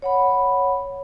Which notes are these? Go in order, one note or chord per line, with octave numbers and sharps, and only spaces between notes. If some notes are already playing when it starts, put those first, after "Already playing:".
C#5 F#5 B5